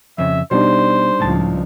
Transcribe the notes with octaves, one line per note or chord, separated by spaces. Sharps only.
F2 C#3 E5
B2 G3 D4 D#4 C5
C#2 A2 F3 A5